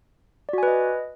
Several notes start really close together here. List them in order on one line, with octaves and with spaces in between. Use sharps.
D5 F#4 G#5 B4 D#5